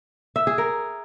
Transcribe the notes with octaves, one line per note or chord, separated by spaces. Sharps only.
E5
G#4
A#4